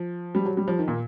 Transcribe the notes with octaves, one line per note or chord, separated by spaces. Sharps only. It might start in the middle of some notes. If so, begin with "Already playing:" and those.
Already playing: F3
G3
F#3
G3
F3
D#3
A#2